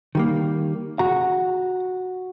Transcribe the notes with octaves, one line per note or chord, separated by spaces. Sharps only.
D#3 G3 A#3
F#4 A#5